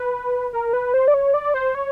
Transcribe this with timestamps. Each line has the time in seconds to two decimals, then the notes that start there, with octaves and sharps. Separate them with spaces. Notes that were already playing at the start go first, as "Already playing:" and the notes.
Already playing: B4
0.53 A#4
0.73 B4
0.94 C5
1.08 D5
1.14 C#5
1.34 D5
1.54 C5
1.75 C#5